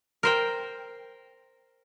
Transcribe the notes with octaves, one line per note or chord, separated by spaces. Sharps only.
A#4 C5 G5